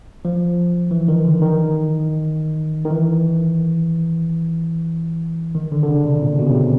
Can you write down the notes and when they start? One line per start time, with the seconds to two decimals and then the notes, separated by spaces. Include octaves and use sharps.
0.25 F3
0.91 E3
1.08 D#3
1.25 D3
1.42 D#3
2.85 D#3
2.90 E3
5.55 D#3
5.72 D3
5.83 D3
5.88 C#3
6.05 C3
6.22 A#2
6.39 B2
6.47 C#3
6.54 C3